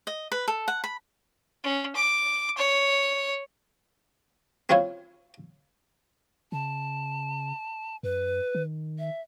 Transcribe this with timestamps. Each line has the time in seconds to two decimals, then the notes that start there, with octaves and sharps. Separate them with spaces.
0.07 D#5
0.32 B4
0.48 A4
0.68 F#5
0.84 B5
1.64 C#4
1.96 D6
2.57 C#5
4.69 C4 C#4 E4 F4 C5 C#5
6.52 C#3 A5
8.03 F#2 B4
8.55 D#3
8.99 E5